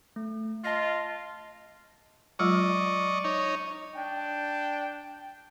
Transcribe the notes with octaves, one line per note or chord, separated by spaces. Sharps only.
A3
F4 D#5 A5 A#6 C7
F#3 G#3 F4 D5 D#5 C#6
D#4 C#5
D4 G5